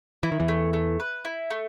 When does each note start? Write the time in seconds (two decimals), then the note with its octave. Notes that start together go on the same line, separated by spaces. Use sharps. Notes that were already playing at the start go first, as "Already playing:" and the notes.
0.23 E3 E4
0.32 D#3
0.40 E2 E3
0.48 A3
0.73 A3
1.00 B4
1.25 E4
1.50 A3